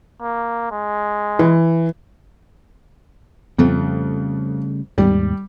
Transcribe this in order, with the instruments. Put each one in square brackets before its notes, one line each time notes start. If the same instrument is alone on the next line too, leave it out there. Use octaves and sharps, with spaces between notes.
[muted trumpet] A#3
G#3
[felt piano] E3
[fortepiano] F2 [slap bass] C#3 G3 A3
[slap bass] D#2 G#2 [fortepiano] G3